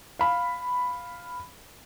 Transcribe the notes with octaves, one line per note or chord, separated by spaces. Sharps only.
F5 B5